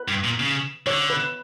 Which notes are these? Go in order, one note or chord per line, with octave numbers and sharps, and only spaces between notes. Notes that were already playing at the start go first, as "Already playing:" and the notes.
Already playing: B4
G2
A#2
C#3
D3 C#5
B4